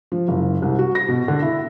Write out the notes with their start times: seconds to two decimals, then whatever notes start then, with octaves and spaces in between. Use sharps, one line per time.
0.12 F3
0.28 F#1
0.62 C2
0.79 F#4
0.95 A#6
1.08 B2
1.28 D3
1.42 E4